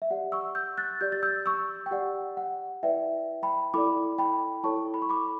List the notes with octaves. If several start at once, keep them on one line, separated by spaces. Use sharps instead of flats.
E5
G4 D5 F#5
C#6 E6
E6 G6
F#6 A6
G4 D5 G6
A6
E6 G6
C#6 E6
G5
G4 D5 F#5
F#5
E4 B4 D5 E5 G5
G5 B5
E4 A4 D5 B5 D6
G5 B5
E4 A4 C#5 A5 C#6
B5
C#6
B5 D6